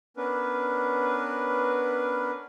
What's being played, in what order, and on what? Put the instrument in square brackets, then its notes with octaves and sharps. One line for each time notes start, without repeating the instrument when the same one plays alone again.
[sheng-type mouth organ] B3 C#4 D4 A#4 B4